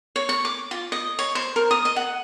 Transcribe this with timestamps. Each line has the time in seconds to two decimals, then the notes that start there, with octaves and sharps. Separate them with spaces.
0.16 C#5
0.29 C#6
0.45 D6
0.71 F4
0.92 D#5
1.19 C#5
1.35 C5
1.56 A#4
1.71 D#6
1.85 D#5
1.96 F#5